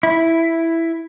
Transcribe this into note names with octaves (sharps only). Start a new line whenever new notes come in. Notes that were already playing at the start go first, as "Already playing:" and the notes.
E4